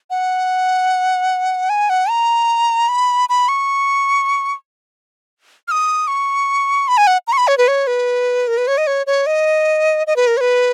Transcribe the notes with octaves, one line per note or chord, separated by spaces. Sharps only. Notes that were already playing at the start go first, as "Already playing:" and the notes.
F#5
G#5
F#5
A#5
B5
B5
C#6
F6
D#6
C#6
B5
G#5
F#5
A#5
C#6
B5
C#5
B4
C#5
B4
A#4
B4
C#5
D#5
C#5
C#5
D#5
D#5
B4
A#4
C#5
B4